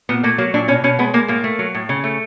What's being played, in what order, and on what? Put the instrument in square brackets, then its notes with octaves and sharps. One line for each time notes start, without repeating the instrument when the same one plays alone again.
[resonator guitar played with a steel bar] A#2 B3
A3 A#3
F#3 A#3
A#2 D4
B2 C#4
B2 C#4
G#3 B3
G#3 A#3
A2 A#3
A3
F#3
A2
C#3
A3